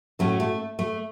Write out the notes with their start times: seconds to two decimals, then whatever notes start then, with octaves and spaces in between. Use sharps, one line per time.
0.19 A2 F#3 A3 C#4
0.40 A3
0.79 A3